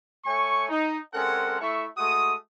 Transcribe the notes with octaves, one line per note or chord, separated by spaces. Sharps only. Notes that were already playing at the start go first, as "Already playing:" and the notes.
A3 C#5 G#5 C#6
D#4
G#3 C4 C#4 A4 A#4 F#5
A3 E4 E5 C#6
G#3 A3 F#4 D#6